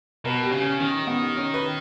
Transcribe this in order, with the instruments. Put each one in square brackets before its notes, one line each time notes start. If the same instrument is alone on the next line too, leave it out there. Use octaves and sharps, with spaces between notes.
[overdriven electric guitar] B2 [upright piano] A#4
[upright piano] G4
[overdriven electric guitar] C#3
[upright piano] C#4
[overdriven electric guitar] D#3 [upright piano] C#4
[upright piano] B3
C#4
B4